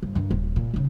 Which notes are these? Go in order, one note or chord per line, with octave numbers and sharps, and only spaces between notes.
G1
G2 D#3
D#1
A#2
D#2 C#3